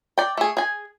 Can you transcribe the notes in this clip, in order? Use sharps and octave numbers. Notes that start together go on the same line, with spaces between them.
D5 G5
A3 G#4
G#4 G#5